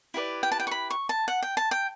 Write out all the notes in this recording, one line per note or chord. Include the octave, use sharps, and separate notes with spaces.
E4 G4 B4 D5
G5
A5
G5
C#6
B5
C#6
A5
F#5
G5
A5
G5